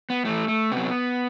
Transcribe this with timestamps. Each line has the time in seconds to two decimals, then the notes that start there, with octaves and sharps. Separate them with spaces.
0.10 B3
0.25 A2 E3 A3
0.48 A3
0.72 C3 B3
0.77 F#3